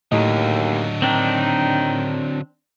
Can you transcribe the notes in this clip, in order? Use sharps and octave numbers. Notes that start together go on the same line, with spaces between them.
D#2 A2 D3 F#3 D#5
D#3 C4 D4